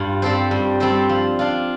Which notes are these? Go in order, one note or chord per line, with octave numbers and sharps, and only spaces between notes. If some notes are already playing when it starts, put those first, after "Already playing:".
Already playing: G2 F4
G3 C4 A4 C5
G2
G3 C4 A4 C5
F3
D4 F4